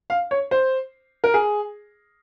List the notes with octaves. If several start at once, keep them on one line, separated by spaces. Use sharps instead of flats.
F5
C#5
C5
A#4
G#4